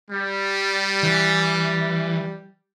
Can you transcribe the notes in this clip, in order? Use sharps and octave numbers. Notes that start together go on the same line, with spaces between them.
G3
E3